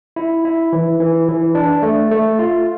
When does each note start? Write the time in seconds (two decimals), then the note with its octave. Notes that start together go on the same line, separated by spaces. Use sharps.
0.16 E4
0.45 E4
0.73 E3
1.00 E3
1.28 E3
1.55 D4
1.83 A3
2.11 A3
2.39 F4